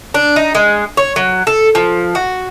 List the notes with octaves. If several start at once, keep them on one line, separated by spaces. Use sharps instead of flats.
D4
D#4
G#3
C#5
F#3
A4
F3
F#4